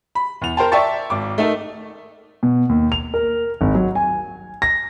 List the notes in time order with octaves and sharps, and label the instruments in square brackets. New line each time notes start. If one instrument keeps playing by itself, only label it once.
[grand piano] B5
E2 F7
A#4 C5 G5 A5
D5 E5 G5 A5 C#6 A6
G#1 D6
A3 D#4 A4 A#4
B2
D#2
F7
A#4
G#1
F#3
G#5
A#6